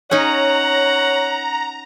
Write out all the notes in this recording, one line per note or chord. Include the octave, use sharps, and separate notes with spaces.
C#4 D#4 C#5 F#5 A#5